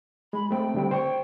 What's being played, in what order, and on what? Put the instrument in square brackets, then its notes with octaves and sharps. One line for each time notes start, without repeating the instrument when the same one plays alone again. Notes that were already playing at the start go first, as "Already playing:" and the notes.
[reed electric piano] G#3 [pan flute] B5
[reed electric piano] A3 C4 [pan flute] G5
[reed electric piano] D3 G3 C4
[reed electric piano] C5 C#6 [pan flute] G5